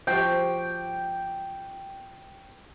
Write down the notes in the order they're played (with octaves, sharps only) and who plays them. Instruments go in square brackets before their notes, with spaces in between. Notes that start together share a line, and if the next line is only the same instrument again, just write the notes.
[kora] F3 F#4 G4 [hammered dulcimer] G5